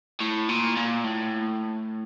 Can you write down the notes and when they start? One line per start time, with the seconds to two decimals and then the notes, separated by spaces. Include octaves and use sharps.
0.20 A2
0.49 A#2
0.77 A#2
1.04 A2